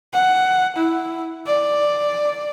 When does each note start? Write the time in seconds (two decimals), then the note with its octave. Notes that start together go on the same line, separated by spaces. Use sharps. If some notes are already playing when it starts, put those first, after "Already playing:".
0.13 F#5
0.76 E4
1.47 D5